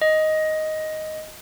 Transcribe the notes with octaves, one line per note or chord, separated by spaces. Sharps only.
D#5